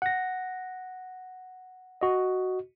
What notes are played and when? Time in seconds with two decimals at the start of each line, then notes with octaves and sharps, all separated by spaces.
0.02 F#5 A#6
2.01 F#4 D#5